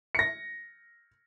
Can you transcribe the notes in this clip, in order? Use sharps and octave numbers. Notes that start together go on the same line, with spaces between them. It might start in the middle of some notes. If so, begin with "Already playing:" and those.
A#6 C#7